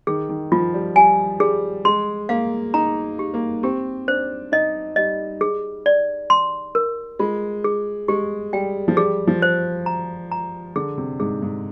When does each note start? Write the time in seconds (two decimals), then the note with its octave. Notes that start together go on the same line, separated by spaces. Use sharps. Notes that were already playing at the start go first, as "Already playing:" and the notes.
0.07 D#3 G#4
0.29 D#3
0.52 F3 F4
0.74 G3
0.96 G3 G#5
1.40 G3 G#4
1.85 G#3 C6
2.29 A#3 F5
2.74 D#4 A#5
3.19 G4
3.34 A#3
3.63 C4 G4
4.08 D4 C5
4.52 D#4 D#5
4.96 G3 D#5
5.41 G#4
5.86 D5
6.30 C6
6.75 A#4
7.19 G#3 F4
7.64 G#4
8.08 G#3 G4
8.53 G3 G5
8.88 F3
8.97 G3 G#4
9.27 F3
9.42 C5
9.86 A#5
10.31 A#5
10.76 D3 G#4
10.98 C3
11.20 G#2 G#4
11.42 G#2